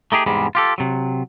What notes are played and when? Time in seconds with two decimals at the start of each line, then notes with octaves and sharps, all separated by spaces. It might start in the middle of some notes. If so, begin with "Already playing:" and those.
0.12 A3 D#4 G4 G#4
0.26 E2 G#2 C3 G3 G#3
0.55 F4 G4 A4
0.78 C3 F#3